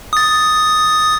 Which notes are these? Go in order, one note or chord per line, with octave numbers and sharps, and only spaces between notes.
D#6 A6